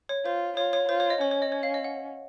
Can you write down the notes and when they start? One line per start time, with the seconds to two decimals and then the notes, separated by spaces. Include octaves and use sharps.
0.09 C#5
0.25 F4 C5
0.57 F4 C#5
0.73 C#5
0.89 F4 C5
1.00 C#5
1.10 D#5
1.21 C#4 C#5
1.31 C#5
1.42 D#5
1.52 C#5
1.63 F5
1.74 D#5
1.84 F#5